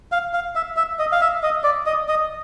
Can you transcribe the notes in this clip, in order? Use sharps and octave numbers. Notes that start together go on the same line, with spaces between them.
F5
F5
E5
E5
D#5
F5
E5
D#5
D5
D#5
D#5